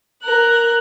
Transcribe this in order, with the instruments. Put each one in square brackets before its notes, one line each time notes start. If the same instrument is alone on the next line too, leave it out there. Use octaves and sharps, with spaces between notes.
[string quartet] A#4 F#6